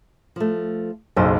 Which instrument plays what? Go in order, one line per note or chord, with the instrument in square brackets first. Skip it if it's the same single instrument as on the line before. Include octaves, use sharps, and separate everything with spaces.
[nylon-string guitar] F3 A3
[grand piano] F#1 B1 [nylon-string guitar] G#4 C5